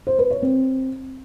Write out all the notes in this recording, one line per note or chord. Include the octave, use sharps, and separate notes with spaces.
C5
B4
C#5
C4